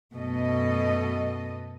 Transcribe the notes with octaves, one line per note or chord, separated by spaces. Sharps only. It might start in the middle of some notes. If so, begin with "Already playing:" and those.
F#2 B2 A3 A4 D#5